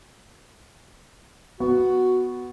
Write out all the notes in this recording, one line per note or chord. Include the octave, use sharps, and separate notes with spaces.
B3 F#4